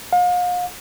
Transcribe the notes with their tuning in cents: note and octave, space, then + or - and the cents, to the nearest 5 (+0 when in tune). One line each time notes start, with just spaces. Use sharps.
F5 +40